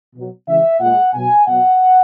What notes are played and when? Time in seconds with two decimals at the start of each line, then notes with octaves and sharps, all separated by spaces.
0.15 B2 F#3
0.48 C#3 E3 G#3 E5
0.80 A#2 G#3 F#5
1.14 B2 F#3 G#5
1.46 B2 F#3 F#5